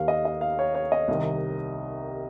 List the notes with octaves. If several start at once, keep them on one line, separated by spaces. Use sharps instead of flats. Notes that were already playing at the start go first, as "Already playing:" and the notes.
Already playing: D#2 D#3 F5
D#5
D#5
F5
C#5
C#5
D#5
C2 C3 D#3